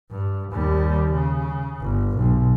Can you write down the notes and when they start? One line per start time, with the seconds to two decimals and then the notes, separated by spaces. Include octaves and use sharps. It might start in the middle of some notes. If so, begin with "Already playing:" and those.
0.11 G2
0.52 D#2 G3
1.12 C#3
1.81 G1
2.18 B1